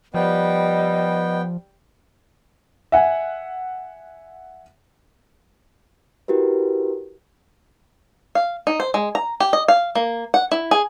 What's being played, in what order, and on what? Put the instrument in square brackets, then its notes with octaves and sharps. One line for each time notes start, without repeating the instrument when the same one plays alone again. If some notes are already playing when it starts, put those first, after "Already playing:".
[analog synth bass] F3 [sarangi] G3 [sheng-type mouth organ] B3 G5 [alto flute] D#5
[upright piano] E5 F#5 G#5
[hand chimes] E4 F#4 G4 A#4 B4
[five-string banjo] F5
D#4
C5
G#3
A#5
G4
D#5
F5
A#3
F#5
E4
G#4